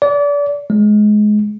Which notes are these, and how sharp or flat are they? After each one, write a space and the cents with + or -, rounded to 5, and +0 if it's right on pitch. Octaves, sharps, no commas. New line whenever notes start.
D5 -30
G#3 +20